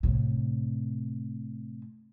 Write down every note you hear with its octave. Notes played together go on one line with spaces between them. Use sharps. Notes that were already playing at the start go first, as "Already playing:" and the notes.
A2 C3